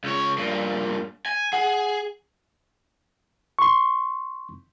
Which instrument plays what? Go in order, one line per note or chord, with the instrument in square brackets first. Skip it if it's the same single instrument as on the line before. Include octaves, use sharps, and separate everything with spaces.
[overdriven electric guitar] C#2 C#5
G2 A#2
G#5
[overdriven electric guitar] G#4 [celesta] F#5
[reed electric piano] C6 C#6